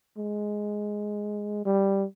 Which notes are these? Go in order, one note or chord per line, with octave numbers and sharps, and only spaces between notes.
G#3
G3